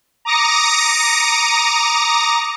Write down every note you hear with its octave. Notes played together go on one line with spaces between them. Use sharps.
A#5 D6 D#6 A#6 C#7